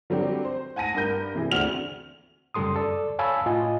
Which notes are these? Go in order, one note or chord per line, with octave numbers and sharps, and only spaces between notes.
D3 F#3 G3 C4 D4 G4
C5
F#5 G#5 A5 A#6 D#7
G2 A#4 G6
C3 E3 G#4
D2 C4 D4 F#4 F6 F7
F#2 C#3 G3 A4 C6 D#6
A4 D5
C#5 F5 G#5 A5 B5 E6
A2 F4 D#5 G#5